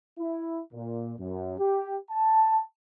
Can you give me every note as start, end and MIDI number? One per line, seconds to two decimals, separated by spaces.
0.19 0.60 64
0.73 1.14 46
1.19 1.55 42
1.59 1.98 67
2.10 2.61 81